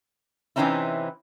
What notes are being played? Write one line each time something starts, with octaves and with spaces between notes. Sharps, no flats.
C3 E3 C4 C#4 D#4 E4